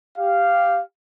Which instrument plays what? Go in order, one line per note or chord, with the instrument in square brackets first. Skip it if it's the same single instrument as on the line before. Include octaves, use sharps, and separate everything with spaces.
[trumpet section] G4 F5